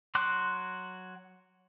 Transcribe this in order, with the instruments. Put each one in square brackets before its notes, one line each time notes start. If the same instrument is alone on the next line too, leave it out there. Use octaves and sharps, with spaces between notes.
[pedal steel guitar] F#3 F#4 C6 D6 F#6